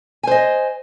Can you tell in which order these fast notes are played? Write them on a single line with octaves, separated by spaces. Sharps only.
G#5 C5 D#5